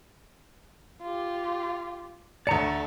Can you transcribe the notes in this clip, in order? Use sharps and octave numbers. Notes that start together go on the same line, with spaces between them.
F4 G4
D2 A3 D5 A5 A#5 C#6 C#7